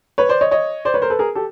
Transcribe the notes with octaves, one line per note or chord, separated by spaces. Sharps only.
B4 C#5
C5 D5
C#5 D#5
C#5 D#5
C5 D5
B4 C#5
A#4 C5
A4 B4
G#4 A#4
G4 A4